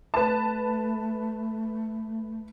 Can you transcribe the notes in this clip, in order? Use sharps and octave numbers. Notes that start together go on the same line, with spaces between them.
A3 B4 A5